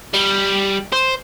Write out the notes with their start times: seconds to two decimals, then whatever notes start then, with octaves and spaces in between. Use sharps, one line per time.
0.14 G3
0.92 C5